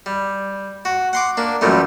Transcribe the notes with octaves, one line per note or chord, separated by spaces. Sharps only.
G3
F#4
F#5 C6 D6
A#3 D4
F#2 A#2 E3 G3 A3